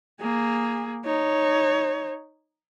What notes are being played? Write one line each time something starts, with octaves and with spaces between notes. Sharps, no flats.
A#3 G#4
D#4 C#5